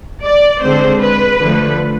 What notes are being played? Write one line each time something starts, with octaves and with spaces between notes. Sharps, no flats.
D5
D3 G#3 C4 C5
B4
D3 F3 A3